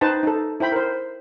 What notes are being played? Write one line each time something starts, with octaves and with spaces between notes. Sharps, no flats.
D#4 B4 C5 G5 A5
D#4 A4
E4 C5 G5 B5
A#4 C5